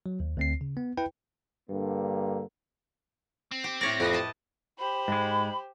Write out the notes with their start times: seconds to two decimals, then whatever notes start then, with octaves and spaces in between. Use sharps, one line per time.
0.06 F#3
0.20 D#2
0.37 D2 C4 C7
0.61 C#3
0.77 B3
0.97 E4 B4 G5
1.69 G2 D3 A#3
3.51 C4
3.64 G4
3.81 A2 C#5 D5 A#6
4.00 F2 G4 B4 D#5
4.13 D#5 A5
4.78 G4 C5 B5
5.08 G#2 G#3